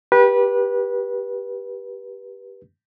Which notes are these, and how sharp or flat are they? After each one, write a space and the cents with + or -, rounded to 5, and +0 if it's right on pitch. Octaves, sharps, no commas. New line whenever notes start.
G4 +0 B4 -25